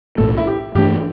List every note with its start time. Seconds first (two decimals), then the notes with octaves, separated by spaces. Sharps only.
0.18 B1 A2 A3 A4
0.37 E4
0.47 G4
0.75 G2 E3 A3 D4 G4